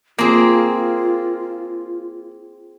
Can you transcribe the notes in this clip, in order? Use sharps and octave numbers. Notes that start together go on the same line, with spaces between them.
A#3 C4 F4 G#4